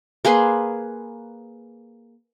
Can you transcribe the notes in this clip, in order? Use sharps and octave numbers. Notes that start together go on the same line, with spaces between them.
A#3 G#4 B4 C6